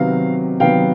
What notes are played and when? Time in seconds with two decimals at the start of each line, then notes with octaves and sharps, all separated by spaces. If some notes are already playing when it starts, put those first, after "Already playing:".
Already playing: C3 D#3 F#3 B3 F5
0.60 C3 D#3 F#3 B3 F5 G5